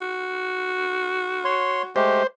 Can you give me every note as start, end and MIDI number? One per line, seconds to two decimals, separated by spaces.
0.02 1.93 66
1.45 1.82 73
1.45 1.82 84
1.96 2.23 56
1.96 2.23 57
1.96 2.23 67
1.96 2.27 72